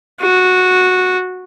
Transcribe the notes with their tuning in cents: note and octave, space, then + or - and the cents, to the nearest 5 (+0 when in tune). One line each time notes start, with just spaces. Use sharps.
F#4 -10